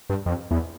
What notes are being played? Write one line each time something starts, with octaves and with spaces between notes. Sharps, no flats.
G2
F2
E2